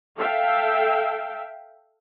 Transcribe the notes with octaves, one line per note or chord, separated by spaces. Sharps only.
A4 E5 F5 G5